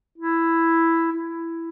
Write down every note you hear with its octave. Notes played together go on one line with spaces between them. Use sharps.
E4
E4